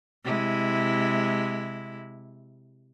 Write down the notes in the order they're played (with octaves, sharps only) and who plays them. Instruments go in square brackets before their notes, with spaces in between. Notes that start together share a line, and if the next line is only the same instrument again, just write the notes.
[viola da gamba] C3 G#3 E4